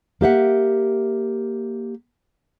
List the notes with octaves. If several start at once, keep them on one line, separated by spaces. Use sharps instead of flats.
A#3 G4 E5 F#5